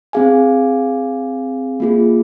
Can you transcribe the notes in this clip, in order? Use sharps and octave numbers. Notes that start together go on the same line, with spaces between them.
C4 G#4 F5 G#5
A#3 F4 G#4